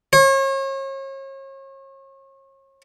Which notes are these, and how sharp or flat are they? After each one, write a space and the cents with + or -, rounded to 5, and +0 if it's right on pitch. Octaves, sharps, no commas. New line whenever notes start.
C#5 -40